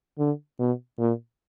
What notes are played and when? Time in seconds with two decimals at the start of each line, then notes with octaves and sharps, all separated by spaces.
0.19 D3
0.59 B2
0.99 A#2